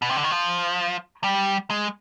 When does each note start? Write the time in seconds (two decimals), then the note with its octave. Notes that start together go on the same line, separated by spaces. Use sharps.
0.02 B2
0.09 C3
0.16 D3
0.23 D#3
0.31 F3
1.24 G3
1.70 G#3